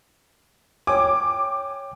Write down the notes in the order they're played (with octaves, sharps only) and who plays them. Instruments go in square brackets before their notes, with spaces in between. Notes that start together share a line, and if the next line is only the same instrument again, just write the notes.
[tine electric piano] C#5 G5 G#5 [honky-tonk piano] D6